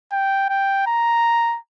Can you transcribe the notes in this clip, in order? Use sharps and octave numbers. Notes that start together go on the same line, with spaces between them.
G5
G5
A#5